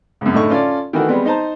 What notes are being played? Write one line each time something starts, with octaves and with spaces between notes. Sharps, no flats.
C#2 F#2
A2 D3 D#4 C#6
C#4 F4 A4 D5
D#3 E3 A3 F#4
G3 G#3 B3 C4
D#4 C5 A5 A#5